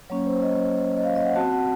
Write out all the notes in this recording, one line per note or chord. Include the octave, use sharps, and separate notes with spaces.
F#3 A#3 C#4 C#5
C5
D#5
D#5
F5
D#5
F#5
C4 F#4 A5
F#5